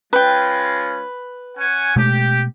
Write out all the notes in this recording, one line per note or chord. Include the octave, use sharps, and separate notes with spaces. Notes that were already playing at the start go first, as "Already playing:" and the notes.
G#3 C#4 F4 B4 G5
C#4 F#5 G#5
B2 G#3 A3 G4